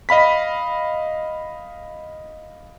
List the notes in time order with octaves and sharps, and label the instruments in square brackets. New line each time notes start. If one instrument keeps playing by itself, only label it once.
[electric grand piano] D#5 F5 B5 B6